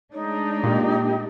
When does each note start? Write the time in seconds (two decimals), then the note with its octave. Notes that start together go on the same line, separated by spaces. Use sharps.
0.13 G#3 A3 D4 D#4 C#5
0.64 A#2 G4